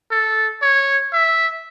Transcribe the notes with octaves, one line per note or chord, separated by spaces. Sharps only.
A4
C#5
E5